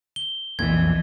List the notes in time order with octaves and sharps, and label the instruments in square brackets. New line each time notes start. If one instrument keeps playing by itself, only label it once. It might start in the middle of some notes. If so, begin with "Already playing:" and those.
[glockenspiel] G7
[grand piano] B1 A#2 [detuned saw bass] F2 [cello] E3 [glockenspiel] G#6